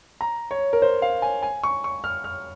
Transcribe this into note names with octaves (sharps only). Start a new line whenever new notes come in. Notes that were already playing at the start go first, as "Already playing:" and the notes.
A#5
C#5
A#4
C5
F5
G#5
G#5
C#6
C#6
F6
F6